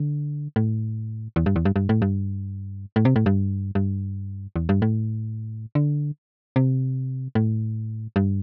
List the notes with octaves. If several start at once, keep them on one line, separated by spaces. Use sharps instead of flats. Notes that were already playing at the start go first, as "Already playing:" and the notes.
Already playing: D3
A2
E2
G2
E2
G2
G2
A2
G2
A2
C3
A2
G2
G2
E2
G2
A2
D3
C3
A2
G2